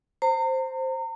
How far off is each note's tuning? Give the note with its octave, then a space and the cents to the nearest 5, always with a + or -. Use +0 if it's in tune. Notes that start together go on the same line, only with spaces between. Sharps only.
C5 +0 A#5 -35